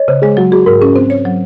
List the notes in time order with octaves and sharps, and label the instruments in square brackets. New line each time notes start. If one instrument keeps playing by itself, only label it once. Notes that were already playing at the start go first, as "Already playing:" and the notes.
Already playing: [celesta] C#5 D#5
[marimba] C#3 [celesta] C5
[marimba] G#3 [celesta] G#4
[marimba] F#3 [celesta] F#4
[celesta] F#4 [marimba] G#4
[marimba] G#2 [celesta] A#4
[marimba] C#4 [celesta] G#4
[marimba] C4 [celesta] C5
[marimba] C#5
F#3